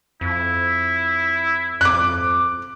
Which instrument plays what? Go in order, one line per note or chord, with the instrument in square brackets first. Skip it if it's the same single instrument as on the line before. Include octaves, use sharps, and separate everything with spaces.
[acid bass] F2 [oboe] E4
[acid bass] F2 [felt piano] D6 F#6